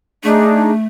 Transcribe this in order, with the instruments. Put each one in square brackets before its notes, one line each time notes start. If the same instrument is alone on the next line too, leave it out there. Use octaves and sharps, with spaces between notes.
[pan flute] A3 [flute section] D4 D#4 G#4